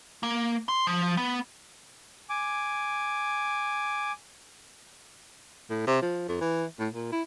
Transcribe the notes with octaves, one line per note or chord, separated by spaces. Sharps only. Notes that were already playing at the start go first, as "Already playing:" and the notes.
A#3
C6
F3
B3
G#5 D6
A2
C3
F3
F2
E3
A2
A#2
E4